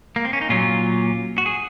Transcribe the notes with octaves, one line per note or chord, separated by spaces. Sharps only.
A#3
C4
C#4
D#4
A#2 F#3 C#4 F4
F#4
G#4